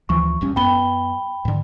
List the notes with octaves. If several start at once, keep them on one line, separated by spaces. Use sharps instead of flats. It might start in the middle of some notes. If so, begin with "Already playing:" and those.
D2 E3 F3 C#6
G1 G2 C#4
F#2 B3 G5 B5 G7
G#2 D3